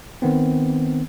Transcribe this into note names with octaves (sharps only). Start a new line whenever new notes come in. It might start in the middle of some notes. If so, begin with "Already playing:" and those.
D#3 B3 C4